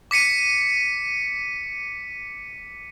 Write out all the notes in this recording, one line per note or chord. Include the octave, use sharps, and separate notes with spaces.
D6 B6 C#7 D#7